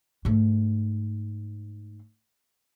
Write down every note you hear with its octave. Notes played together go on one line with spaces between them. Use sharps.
G#2 A3